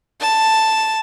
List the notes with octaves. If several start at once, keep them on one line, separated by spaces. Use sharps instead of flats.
A5